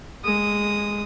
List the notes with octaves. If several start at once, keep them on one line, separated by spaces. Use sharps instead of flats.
G#3 D#6